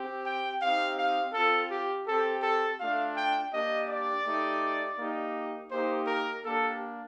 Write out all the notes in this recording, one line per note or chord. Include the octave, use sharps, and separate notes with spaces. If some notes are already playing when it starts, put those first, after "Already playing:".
Already playing: C4 G4
G5
C4 D#4 G4 F5
F5
C4 F4 A4
G4
C4 G4 A4
A4
A3 D4 F4 F5
G5
A#3 D4 G4 D#5
D5
A3 D#4 G4
A#3 D#4 G4
A#3 D#4 G4 C5
A#4
A#3 D4 G4 A4